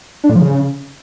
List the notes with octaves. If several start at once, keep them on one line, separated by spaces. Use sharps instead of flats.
D4
A2
F3
C#3